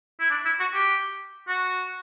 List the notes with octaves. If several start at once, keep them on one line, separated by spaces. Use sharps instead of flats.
E4
D4
E4
F#4
G4
F#4